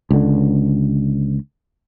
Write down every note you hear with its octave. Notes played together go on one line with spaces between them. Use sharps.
C#2 D3